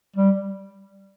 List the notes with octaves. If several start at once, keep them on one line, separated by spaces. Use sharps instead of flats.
G3